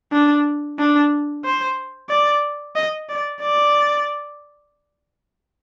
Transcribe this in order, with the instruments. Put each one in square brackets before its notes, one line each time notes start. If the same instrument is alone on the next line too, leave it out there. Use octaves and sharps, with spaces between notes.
[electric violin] D4
D4
C5
D5
D#5
D5
D5